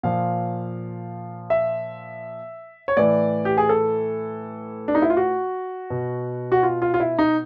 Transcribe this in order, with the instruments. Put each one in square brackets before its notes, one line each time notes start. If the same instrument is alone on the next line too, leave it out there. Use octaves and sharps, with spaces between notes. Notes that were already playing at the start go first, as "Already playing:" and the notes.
[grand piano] A#2 F3 F5
E5
C#5
A2 E3 D5
G4
G#4
A4
D4
D#4
E4
F4
F#4
B2
F#4
F4
F4
F4
E4
D#4